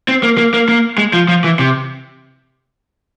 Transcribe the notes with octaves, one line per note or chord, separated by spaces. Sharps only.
C4
A#3
A#3
A#3
A#3
G#3
F3
F3
E3
C3